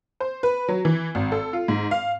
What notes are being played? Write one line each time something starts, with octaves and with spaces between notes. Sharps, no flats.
C5
B4
F#3
E3
G#1
A4
F4
G#2
F5